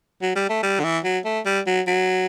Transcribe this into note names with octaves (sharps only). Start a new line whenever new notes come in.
F#3
G3
A3
G3
D3
E3
F#3
A3
G3
F#3
F#3